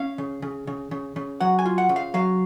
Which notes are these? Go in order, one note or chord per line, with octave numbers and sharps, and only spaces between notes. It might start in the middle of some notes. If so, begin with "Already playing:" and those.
Already playing: C#4 F5
C#3
C#3
C#3
C#3
C#3
F#3 F#5
G#5
F4
F#5
C#3
F5
F#3 F5